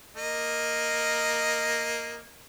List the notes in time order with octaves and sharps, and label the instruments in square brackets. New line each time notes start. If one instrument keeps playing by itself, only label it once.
[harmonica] A#3 D#5